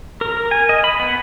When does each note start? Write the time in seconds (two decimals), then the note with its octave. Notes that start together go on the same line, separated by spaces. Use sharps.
0.21 A#4
0.51 G#5
0.69 D#5
0.84 B5
1.00 B3